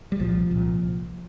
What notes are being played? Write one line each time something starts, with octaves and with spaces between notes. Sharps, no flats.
G3
C2 A#2 F3
C2 A#2